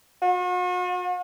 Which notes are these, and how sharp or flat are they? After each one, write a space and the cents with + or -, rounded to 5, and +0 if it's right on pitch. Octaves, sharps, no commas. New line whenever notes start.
F#4 -45